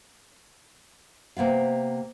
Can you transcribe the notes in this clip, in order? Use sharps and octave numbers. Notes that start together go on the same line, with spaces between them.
C3 A#3 B3 F5